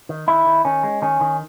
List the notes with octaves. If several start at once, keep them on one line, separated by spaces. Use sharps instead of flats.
D#3
D#3 E4
D#3
D#3 C#4
G#3
D#3 C#4
D#3